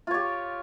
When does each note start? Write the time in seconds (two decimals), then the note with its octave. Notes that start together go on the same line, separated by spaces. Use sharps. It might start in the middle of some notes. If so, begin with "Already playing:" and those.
0.07 F4
0.11 C#5
0.14 G4